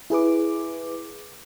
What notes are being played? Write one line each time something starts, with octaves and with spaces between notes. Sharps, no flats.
E4 G#4 B4 D6